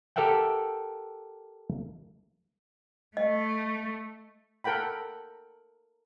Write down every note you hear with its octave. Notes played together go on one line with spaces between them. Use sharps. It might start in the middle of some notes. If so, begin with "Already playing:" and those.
G4 A4 A#4 E5 F#5 G5
A3 D#5
A4 A#4 F#5 G5 B5